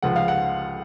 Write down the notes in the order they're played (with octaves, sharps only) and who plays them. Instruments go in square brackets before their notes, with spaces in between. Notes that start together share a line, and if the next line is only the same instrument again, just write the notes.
[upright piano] C#2 C#3 F3 F#5
F5
F#5